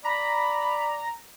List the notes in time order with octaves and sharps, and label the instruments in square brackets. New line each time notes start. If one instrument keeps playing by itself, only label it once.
[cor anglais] D5 [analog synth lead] A#5 [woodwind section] B5